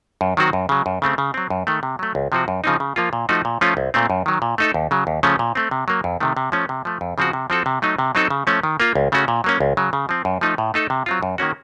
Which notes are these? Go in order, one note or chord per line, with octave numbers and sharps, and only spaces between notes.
F#2
D#3 F#3 C4 F#4
F#2
C#3 F#3
F#2
C#3 A3 C4
C#3
F#3 C4
F#2
D#3 A3
C3
F#3 A3
C#2
C3 F3 C4 F#4
F#2
C#3 F3 C4 D#4
C#3
F3 A#3 F4
A#2
F3 A3 D#4 F#4
A#2
F3 A3 C#4 F4
C2
A#2 A3 C4
F#2
D#3 F#3
A#2
A3 D#4 A4
D#2
C#3 F#3
D#2
C#3 F3 A3 C#4
A#2
A3 C4
C3
F#3 A#3
F2
C3 D#3 A3
C3
F3 A3 C#4
C3
F3 A3
F2
C#3 F3 C4 F#4
C3
F3 C4 F#4 A4
C3
F#3 A3 D#4
C3
F#3 C4 D#4 A4
C#3
F3 A3 C#4
D#3
A#3 F4
C#2
C#3 A3 C#4 F#4
A#2
F#3 A#3 C#4
C#2
C#3 F#3
C#3
F3 C4
F#2
F3 A3 D#4
A2
A3 D#4 A4
C3
F#3 C4 F4
F#2
D#3 A#3 C#4 F#4